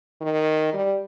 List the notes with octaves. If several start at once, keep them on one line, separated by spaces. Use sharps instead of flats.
D#3
G3